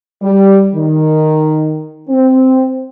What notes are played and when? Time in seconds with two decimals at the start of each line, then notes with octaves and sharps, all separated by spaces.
0.21 G3
0.74 D#3
2.09 C4